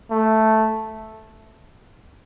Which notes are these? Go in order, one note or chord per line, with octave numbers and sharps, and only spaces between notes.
A3